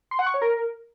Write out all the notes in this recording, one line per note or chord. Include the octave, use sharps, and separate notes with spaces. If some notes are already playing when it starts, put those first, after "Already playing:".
C6
F#5
C#6
C#5
A#4